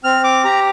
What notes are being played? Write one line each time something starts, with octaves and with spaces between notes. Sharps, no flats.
C4 F6
D6
G4 A#5